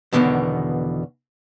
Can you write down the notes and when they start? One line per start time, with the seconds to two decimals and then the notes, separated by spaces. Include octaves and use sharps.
0.13 E2 B2 D3 D#3 B3